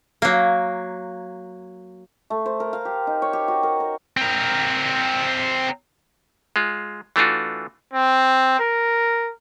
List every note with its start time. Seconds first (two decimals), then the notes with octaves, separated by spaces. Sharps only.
0.22 F#3 A#3
2.30 A3
2.46 C5
2.60 A#4
2.73 F5
2.85 G4
3.07 D#4
3.22 C#5
3.33 G4
3.48 F#4
3.63 A#4
3.80 A#4
4.17 C4 A#4
6.56 G#3 F4
7.16 E3 A3 D4 F4 F#4
7.94 C4
8.59 A#4